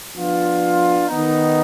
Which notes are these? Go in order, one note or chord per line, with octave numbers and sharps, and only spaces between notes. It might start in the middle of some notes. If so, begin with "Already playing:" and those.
F3 B3 D4 F4
D#3 B3 D#4